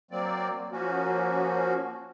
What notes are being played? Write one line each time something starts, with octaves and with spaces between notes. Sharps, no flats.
F#3 A#3 C4 D5
F3 A#3 C#4 F#4